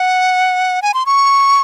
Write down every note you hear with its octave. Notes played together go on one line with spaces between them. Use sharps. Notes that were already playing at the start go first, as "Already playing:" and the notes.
Already playing: F#5
G#5
C6
C#6